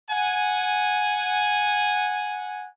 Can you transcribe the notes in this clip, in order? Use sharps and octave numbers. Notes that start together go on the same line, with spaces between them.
F#5 G#5